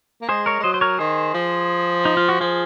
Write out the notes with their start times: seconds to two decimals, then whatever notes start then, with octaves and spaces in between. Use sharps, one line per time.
0.22 A#3
0.29 G#3 G#4 C5
0.46 A#4 C#5
0.59 G#3
0.64 F#3 C5 D#5
0.74 C5
0.81 A#4 C#5
0.99 D#3 G#4 C5
1.34 F3
2.05 D#4
2.17 F4
2.29 F#4
2.40 F3 F4 G#4